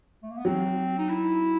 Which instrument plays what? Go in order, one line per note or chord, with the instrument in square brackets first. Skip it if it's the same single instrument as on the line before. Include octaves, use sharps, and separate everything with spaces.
[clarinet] A3
A#3
B3
[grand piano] F#3 [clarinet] C4
[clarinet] D#4
E4